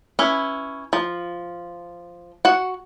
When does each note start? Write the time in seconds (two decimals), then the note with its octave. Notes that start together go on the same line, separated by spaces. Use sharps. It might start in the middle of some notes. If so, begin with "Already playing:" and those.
0.19 C#4 E4 B4
0.93 F3
2.45 F#4 F#5